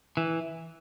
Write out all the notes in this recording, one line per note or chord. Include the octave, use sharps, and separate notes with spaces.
E3